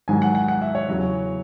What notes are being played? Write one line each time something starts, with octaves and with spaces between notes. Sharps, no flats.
G#2 D#3 F#3 G#5
F#5
F#5
F#5
E5
C#5
E2 C#3 F#3